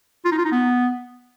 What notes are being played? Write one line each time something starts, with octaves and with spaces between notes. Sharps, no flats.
F4
D#4
F4
D#4
B3